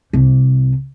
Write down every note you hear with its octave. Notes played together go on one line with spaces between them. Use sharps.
C2 C3